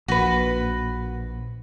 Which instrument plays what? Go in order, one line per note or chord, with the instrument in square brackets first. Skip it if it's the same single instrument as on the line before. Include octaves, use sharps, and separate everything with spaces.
[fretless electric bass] A#1 [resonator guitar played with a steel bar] F#4 B4